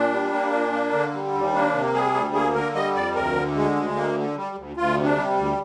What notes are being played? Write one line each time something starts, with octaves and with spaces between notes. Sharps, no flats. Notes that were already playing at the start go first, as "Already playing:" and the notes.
Already playing: A#2 D4
G3
A#3
A#2
A#3
D3
G3
D#2
A#3 D4
C3
G3 G#4
D2
A#3 G#4
D3 A#4
G3 D#5
F2 D5
D2 A#4
D3
G#3
D2
A#3
D3
G3
D2
D2 F4
C3
D4
G3
D2